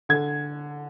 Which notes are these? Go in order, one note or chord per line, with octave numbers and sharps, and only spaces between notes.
D3 G#6